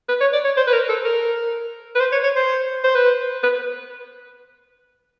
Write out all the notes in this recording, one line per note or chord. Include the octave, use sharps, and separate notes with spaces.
B4
C#5
D5
C#5
C5
B4
A#4
A4
A#4
B4
C5
C#5
C#5
C5
C5
B4
B4